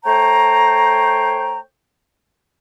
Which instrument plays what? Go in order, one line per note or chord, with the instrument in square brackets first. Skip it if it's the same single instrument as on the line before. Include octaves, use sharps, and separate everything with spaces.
[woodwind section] A3 C5 C#5 G5 A#5